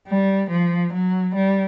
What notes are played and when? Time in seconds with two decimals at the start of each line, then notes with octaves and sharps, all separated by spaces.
0.08 G3
0.50 F3
0.93 F#3
1.35 G3